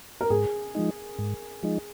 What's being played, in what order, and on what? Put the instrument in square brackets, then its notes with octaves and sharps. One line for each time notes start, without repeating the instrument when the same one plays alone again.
[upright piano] A#4
[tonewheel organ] G#2 [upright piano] G#4
[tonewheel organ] F3 G#3 D#4
G#2
F3 G#3 D#4